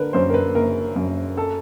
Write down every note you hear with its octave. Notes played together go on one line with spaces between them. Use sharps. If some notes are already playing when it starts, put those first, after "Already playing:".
Already playing: D3 A#4 B4
F#2 C5
A#4
B4
F#1 A#4
F#2
A4